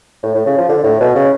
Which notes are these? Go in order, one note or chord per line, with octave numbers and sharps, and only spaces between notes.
A2
A2
C#3
F3
D3
A2
B2
C#3